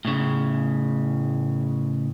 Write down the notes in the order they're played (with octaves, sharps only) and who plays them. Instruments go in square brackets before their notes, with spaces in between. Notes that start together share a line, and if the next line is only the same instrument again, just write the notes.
[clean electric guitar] A2 C#3